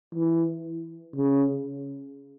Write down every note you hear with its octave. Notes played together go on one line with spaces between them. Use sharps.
E3
C#3